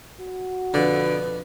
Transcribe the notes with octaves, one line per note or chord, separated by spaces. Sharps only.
F#4
F2 B2 D3 B4 D5